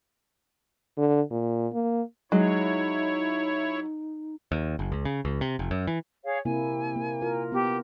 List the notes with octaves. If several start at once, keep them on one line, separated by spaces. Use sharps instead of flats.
D3
A#2
A#3
F#3 G#3 D#4 E4 C#5
D#2
F#1
C#2
C#3
C#2
C3
F1
F#2
E3
G#4 C#5 F5
C3 A#3 E4 G#5
A#3
F4 A#4
B3 G4